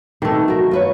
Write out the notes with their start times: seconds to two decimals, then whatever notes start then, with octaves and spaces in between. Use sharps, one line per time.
0.22 B2 D#3 A3
0.48 F#4 A#4
0.71 F4 B4 C#5